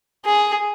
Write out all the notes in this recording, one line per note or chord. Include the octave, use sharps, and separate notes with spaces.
G#4